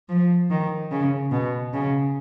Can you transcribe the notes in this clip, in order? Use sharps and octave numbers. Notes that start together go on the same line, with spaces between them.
F3
D#3
C#3
B2
C#3